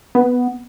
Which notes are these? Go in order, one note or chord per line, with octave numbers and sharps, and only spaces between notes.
B3